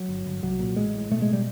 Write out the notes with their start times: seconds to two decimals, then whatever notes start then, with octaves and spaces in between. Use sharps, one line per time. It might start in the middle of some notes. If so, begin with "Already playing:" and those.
Already playing: F#3
0.09 G1
0.26 G1
0.43 C2 F#3
0.60 A#2
0.76 A1 G#3
0.94 A2
1.11 B2 A3
1.22 G#3
1.33 G3